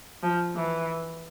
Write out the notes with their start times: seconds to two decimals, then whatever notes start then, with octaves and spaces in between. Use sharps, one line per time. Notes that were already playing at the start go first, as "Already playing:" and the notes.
0.23 F3
0.56 E3